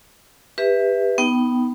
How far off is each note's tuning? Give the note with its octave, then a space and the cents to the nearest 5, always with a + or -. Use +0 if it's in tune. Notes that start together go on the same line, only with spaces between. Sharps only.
G4 +25 B4 +0 E5 +0
B3 +0 D#4 +5 G5 -25